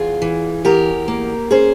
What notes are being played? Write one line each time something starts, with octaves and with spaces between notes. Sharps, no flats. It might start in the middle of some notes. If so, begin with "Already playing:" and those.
Already playing: E2 F4 G#4
E3
E2 G4 A#4
A#3
C#4 G#4 C5